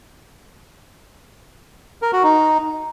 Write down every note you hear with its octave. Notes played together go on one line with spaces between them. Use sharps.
A#4
F#4
D#4